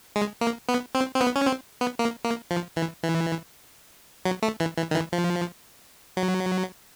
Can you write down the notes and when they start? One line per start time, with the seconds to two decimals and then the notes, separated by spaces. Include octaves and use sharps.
0.16 G#3
0.41 A#3
0.69 B3
0.95 C4
1.15 C4
1.21 B3
1.36 C#4
1.47 C4
1.81 B3
1.99 A#3
2.25 A#3
2.51 F3
2.77 E3
3.03 E3
4.25 F#3
4.43 A3
4.60 E3
4.77 E3
4.91 D#3
4.95 E3
5.13 F3
6.17 F#3